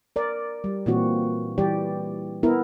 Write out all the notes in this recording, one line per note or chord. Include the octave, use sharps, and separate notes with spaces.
A#4 D5
G3
A#2 E3 A#3 C4 F#4
E3 G3 G4 D5
B3 E4 A#4